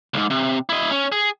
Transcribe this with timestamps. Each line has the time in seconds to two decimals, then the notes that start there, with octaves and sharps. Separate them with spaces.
0.14 C2 G#2
0.30 C3
0.69 E4 D#5
0.91 C#4
1.12 G#4